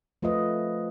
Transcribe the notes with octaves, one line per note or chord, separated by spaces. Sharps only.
F3 A3 F4 B4 D#5